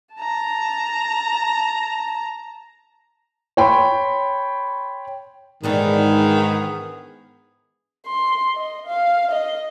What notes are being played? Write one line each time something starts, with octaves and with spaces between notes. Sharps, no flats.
A5 A#5
C#5 G5 B5 C6
G#2 D#3 E3 B3 D4 G#4 A4
C6
D#5
F5
D#5